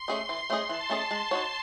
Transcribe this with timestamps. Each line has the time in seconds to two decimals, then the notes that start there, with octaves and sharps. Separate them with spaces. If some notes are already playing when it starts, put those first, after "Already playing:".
Already playing: C6
0.08 A3 C#4 G#4 D#5
0.28 E3 C6
0.50 A3 C#4 G#4 D#5
0.69 E3 A5
0.90 A3 C#4 G#4 D#5
1.11 G#3
1.31 D#4 F#4 C#5